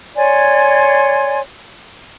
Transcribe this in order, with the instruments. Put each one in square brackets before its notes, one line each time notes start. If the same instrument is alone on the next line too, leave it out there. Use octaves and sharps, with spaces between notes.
[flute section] C#5 D5 G#5 C6